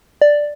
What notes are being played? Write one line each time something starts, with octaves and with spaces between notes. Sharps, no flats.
D5